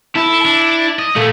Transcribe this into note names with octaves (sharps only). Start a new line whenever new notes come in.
E4 A4
D4
D#5
A#2 A3